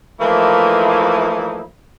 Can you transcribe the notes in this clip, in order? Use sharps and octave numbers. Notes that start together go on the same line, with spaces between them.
E3 F3 A3 A#3 D#4 E4